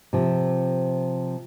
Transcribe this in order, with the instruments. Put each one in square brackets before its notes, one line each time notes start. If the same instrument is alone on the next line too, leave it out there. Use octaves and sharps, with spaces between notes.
[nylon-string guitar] C3 F3